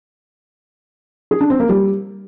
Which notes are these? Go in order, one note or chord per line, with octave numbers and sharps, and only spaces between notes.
G#4
D4
C4
A#3
G3